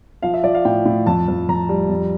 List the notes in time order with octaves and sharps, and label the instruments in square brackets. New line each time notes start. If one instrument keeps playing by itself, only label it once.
[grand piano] F3 F5
E5
F3 D5
F5
A2 G5
A2
F2 A5
F2
F2 A#5
G3
F2